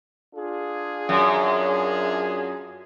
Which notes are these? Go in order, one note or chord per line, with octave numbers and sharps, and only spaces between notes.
D4 F4 G#4
F#2